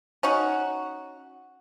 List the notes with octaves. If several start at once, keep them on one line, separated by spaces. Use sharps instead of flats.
C#4 D#4 F#4